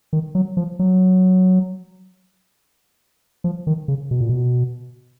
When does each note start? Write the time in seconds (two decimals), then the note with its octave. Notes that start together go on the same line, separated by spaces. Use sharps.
0.13 D#3
0.35 F#3
0.57 F3
0.79 F#3
3.44 F3
3.67 D#3
3.88 C#3
4.11 B2
4.20 A#2
4.29 B2